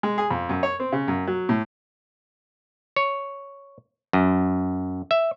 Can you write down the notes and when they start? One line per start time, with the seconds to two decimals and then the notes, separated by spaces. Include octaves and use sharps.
0.03 G#3
0.18 G#4
0.31 F2
0.49 F#2
0.63 C#5
0.80 C4
0.92 C#3
1.08 F#2
1.27 F#3
1.49 A2
2.96 C#5
4.13 F#2
5.11 E5